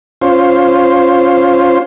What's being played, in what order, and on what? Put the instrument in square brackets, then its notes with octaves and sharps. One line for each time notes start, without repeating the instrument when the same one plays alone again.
[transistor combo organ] C#4 F4 C5